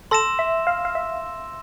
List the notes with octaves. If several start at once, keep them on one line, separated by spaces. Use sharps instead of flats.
A4 C6 E6 A#6 E7
E5
F5
F5
E5